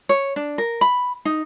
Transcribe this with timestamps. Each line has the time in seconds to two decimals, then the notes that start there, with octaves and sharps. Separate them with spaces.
0.09 C#5
0.36 D4
0.58 A#4
0.81 B5
1.25 D#4